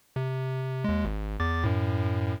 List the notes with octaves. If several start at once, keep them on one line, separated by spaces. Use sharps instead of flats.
C3
D#2 G#3
G#1
E2 D6 A6
F#2 A2